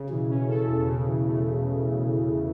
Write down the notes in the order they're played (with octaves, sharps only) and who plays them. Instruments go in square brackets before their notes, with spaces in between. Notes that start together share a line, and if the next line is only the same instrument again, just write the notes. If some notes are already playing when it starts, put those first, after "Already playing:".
Already playing: [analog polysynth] C#3
[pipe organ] B2 [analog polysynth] E3
[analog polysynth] C#4
A4
E2
C#3
E3
A3